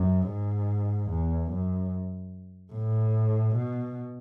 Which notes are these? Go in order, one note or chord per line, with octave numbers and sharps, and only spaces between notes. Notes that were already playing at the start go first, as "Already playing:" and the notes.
Already playing: F#2
G#2
E2
F#2
A2
B2